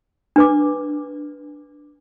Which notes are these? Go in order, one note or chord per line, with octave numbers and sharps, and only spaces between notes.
D4 B4 D6